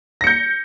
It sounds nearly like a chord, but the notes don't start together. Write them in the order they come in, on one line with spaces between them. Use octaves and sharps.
A#6 C#7 G6